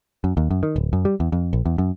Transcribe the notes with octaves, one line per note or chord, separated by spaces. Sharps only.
F#2
D#2
F#2
D#3
D1
F#2
G3
E2
F2
A#1
E2
F#2